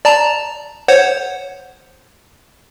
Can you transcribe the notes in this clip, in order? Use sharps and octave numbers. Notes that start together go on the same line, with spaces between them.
D5 A5 A#5
C5 C#5 F#5